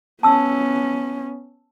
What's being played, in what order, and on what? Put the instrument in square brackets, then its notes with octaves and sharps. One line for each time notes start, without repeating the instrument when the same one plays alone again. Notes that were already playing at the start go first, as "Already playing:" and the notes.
[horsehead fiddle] B3 C#4 [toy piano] A5 E6